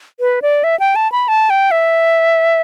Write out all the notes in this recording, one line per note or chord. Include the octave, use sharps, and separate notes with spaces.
B4
D5
E5
G5
A5
B5
A5
G5
E5